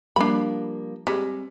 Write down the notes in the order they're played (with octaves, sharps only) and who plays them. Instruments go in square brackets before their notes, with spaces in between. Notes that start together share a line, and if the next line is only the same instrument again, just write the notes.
[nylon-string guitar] F3 G3 A#3 [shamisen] D4 B5
[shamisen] G3 G#3 [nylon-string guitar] C4